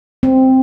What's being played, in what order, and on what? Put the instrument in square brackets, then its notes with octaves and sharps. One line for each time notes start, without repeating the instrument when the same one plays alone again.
[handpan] C4